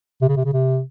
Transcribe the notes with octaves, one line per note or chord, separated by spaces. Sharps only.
C3
C#3
C3
C#3
C3